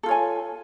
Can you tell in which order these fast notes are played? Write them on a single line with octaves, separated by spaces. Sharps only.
A4 F4 C#5 G#5